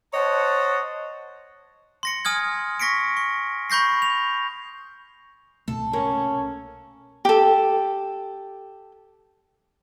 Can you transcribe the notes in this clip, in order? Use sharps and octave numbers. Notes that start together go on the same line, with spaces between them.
C5 C#5 D#5 F#5 A5
C6 A#6 C#7
G#5 D#6 F6 G#6
C#6 A#6 B6 C#7 D7
C#6
B5 C#6 G6 A#6 C7
F7
C2 B2 A3 A4
A#3 C#4
G4 A4